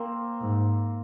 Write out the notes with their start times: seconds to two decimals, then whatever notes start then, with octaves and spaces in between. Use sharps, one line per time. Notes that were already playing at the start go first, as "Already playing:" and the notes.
Already playing: A#3 C4
0.41 G#2